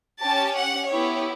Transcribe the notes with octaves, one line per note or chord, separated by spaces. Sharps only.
C#4 G4 A5
F#5
B3 E4 G4 C#5